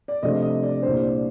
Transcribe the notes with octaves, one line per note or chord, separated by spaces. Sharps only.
D5
C3 F3 A3 D4 D#5
D#5
D5
C2 A#2 G3 D4 C5
D5